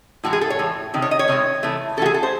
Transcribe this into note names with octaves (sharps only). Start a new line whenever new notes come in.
A2 E3 G#3 F#4
G#4
A4
C#5
A2 E3
C3 D#3
C#5
D#5
C#5
C3 D#3 G#3
C3 E3 A3
C3 E3 A3 F#4 A4
G#4
A4
C5